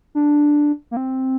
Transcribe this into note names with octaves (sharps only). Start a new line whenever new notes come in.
D4
A#3
C4